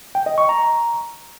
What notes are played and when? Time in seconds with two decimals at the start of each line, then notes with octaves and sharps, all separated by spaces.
0.15 G5
0.26 D#5
0.38 C#6
0.49 A#5